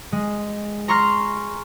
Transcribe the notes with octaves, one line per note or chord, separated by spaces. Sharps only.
G#3
A#5 C6 C#6 F6 A#6 C7